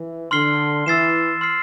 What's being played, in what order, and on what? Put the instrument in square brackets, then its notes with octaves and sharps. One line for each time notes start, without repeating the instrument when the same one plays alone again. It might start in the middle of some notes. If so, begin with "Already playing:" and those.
Already playing: [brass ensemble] E3
[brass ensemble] D3 [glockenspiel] C6 F6 C7 G7
[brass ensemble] E3 [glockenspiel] E6 A6 C7 E7
[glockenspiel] C6 F6 C7